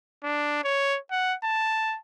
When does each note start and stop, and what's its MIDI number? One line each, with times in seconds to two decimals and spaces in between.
0.24 0.61 62
0.64 0.98 73
1.11 1.34 78
1.44 1.97 81